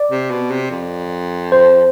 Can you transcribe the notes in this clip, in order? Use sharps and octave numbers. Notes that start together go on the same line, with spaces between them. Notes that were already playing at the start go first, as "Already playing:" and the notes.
Already playing: D5
C3
B2
C3
F2
C5